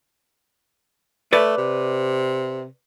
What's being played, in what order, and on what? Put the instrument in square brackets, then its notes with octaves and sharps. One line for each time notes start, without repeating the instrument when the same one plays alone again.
[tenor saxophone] A3 [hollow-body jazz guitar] B4 D5
[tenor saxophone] C3